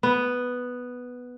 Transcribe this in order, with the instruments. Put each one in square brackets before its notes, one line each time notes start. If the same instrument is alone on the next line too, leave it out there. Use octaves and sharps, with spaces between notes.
[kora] B3